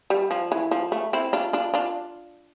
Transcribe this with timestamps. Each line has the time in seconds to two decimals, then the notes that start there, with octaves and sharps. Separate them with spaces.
0.10 G3
0.31 F3
0.52 E3
0.71 F3
0.92 A3
1.13 C4 E4
1.33 D4 F4
1.53 D4 F4
1.74 D4 F4